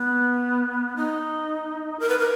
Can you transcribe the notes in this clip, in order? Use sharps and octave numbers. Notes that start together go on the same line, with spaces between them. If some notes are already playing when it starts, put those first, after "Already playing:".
Already playing: B3
D#4
A#4
B4
A#4